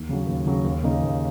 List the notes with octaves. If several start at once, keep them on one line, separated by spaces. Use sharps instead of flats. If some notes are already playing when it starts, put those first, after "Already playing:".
Already playing: D#2
C#3 F#3
D#2
C#3 F#3
D#2
C#3 A#3 D#4 G#4
D#2